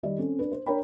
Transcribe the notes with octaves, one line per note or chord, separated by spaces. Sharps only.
D#3 G3 D5 D#5
C4 C#4 A4
C#4 D4 B4
C5
D4 A#4 C#5 G5 A#5 B5